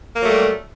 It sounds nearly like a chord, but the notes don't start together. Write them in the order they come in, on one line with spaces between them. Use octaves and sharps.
A#3 F#3 A3 G3